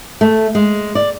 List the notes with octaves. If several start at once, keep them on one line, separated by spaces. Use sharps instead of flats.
A3
G#3
D5